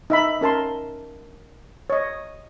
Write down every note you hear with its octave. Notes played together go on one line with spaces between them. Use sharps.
D#4 E5 B5
C#4 A#4 A5 C6
C#5 D#5